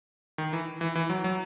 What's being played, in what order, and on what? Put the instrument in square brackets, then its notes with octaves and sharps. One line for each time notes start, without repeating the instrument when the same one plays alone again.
[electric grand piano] D#3
E3
E3
E3
F#3
F#3